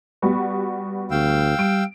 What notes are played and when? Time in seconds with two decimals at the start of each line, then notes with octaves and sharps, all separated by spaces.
0.22 G3 B3 F#4
1.11 D2 F5 G5 E6
1.59 G3 D7